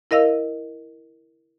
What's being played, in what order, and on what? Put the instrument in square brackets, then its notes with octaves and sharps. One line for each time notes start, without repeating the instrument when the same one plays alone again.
[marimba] E4 A#4 D#5 F5 E6